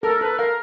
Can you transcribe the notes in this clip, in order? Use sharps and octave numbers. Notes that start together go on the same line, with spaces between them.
A4 A#4
A4 B4
A#4 F5